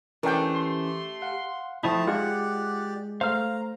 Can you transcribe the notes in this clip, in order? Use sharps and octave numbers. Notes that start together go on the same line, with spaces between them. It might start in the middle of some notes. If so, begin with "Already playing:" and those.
E3 A3 C#4 D4 G4 A#4 G5
C6
F5 F#5
F3 A3 C4 D#4 E4 A5
G#3 F4 G4 D5 F#5
A3 C5 F5 A#5 F6